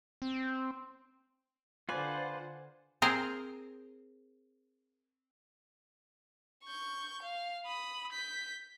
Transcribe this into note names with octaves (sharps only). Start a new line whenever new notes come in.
C4
D3 F4 B4 C5 D5 F#5 G#5
C4 G#4 A#4 C5
C#6 G6
F5
B5 D#6
G6 B6